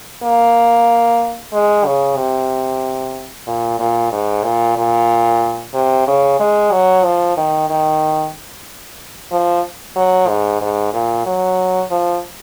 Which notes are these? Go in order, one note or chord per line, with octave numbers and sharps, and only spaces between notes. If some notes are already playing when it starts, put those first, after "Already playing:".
A#3
G#3
C#3
C3
A#2
A#2
G#2
A#2
A#2
C3
C#3
G#3
F#3
F3
D#3
D#3
F3
F#3
G#2
G#2
A#2
F#3
F3